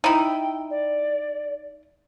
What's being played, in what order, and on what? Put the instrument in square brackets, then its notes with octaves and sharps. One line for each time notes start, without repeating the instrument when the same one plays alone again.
[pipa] D#4 E4 [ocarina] G5
[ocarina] D5